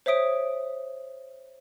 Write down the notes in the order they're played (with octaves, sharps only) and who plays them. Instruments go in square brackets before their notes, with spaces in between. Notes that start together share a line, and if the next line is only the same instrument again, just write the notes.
[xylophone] C5 C#5 E5 D#6 D7